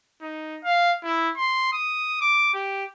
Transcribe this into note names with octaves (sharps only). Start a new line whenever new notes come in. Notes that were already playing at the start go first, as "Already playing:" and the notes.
D#4
F5
E4
C6
D#6
D6
G4